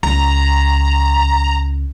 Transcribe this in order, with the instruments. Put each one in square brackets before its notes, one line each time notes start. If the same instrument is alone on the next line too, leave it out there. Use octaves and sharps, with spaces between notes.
[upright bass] C#2 [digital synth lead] A#5